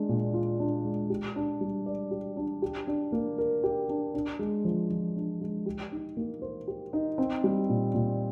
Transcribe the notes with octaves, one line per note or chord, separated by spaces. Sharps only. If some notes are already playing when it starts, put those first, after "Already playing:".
Already playing: G#3 D4
A#2
F4
D4
G#3
G4
D4
G3
D5
G4
D4
G4
D4
A#3
A#4
G4
D4
D4
G#3
F3
F3
D4
G#3
G4
D#4
A#3
C5
G4
D#4
C4
G3
A#2
A#2